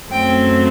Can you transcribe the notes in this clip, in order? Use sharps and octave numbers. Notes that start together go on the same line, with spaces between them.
F#2 F#3 A3 C4 G5